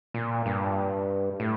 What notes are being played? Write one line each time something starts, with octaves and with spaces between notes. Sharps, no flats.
A#2
G2
A2